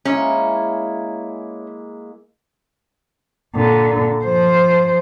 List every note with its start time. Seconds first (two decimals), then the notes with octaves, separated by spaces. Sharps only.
0.05 G#3 A#3 C#4 E4
3.55 A#2 D3
4.25 F3 C5